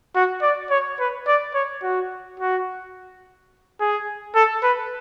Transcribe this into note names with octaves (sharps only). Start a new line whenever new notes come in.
F#4
D5
C#5
B4
D5
C#5
F#4
F#4
G#4
A4
B4